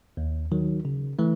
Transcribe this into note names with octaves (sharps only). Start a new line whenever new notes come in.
D#2
D#3 F#3
C#3
E3 A3